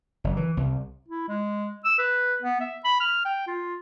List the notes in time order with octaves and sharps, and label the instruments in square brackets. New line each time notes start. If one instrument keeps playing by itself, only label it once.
[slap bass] F#1
E3
C2
[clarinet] E4
G#3
E6
B4
B3
E5
B5
F6
G5
F4